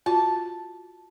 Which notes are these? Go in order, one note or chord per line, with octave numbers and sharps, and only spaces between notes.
F4 F#4 A5